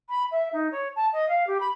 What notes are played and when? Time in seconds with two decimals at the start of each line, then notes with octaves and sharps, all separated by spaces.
0.09 B5
0.31 E5
0.53 D#4
0.72 C#5
0.96 A5
1.13 D#5
1.28 F5
1.47 G4
1.60 B5